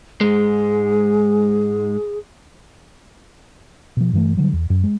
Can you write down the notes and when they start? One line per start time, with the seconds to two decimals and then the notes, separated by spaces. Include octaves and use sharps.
0.21 G#2 G#3 G#4
3.97 B2 F3
4.13 G2 E3 A3
4.37 D3 F#3 G3
4.53 E2
4.70 F#2
4.84 G#3